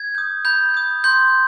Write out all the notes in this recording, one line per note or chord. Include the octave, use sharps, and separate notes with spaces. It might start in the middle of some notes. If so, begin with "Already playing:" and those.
Already playing: G#6
D#6 G6
B5 G6
D#6 G6
C6 G6